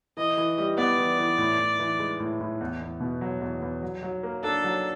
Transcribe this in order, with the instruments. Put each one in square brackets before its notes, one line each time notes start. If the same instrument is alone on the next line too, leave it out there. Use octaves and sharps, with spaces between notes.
[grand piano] E3 [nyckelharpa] D#5
[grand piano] E3
G3
[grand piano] B3 [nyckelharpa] D5
[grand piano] E3
E3
A2
A2
E3
G#3
A2
A2
E2
E2
B2
F#3
E2
E2
F#3
F#3
A#3
[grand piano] D4 [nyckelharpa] A4
[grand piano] F#3